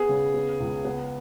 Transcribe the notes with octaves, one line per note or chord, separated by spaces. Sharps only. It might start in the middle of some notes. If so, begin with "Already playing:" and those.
Already playing: B3 G#4
C#3
B3
C#2
B3